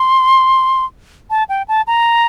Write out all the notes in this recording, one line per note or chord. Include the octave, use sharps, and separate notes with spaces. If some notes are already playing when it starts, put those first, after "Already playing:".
Already playing: C6
A5
G5
A5
A#5